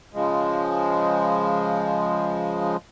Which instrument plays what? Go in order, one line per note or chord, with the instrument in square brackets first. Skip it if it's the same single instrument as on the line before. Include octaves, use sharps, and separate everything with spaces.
[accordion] C#3 F3 G#3